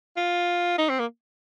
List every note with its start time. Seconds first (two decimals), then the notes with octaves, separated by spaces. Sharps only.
0.17 F4
0.78 D#4
0.89 C4
0.99 A#3